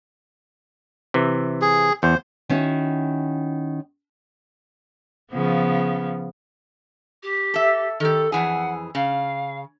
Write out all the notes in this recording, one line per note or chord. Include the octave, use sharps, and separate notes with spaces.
C3 E3
G#4
E2 C5
D#3 C#4 E4 F#4
C#3 F3 B3
G4
A4 E5
D#3 G4 A4
F2 E3 G#4 F#5
C#3 F5